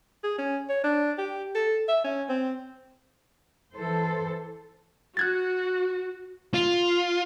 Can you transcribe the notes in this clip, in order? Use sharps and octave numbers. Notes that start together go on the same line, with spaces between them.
G#4
C#4
C#5
D4
G4
A4
E5
C#4
C4
E3 A4 C5
F#4 F#6 G#6 A6
F4